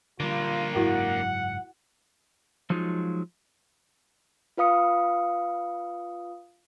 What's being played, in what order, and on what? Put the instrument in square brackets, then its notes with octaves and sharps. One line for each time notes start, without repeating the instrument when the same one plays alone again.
[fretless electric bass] D3 G3 [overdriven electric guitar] A#3 D4 [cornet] F4
[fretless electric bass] F#1 G#2 F#3 [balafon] E4 F#4 A#4 [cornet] F#5
[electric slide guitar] F3 F#3 G#3 D#4 F4
[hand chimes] F4 B4 F5 D#6 C#7